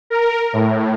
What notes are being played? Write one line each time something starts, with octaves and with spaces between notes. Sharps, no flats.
A#4
A2